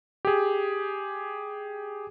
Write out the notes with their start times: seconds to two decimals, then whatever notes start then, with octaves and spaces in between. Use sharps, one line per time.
0.25 G4 G#4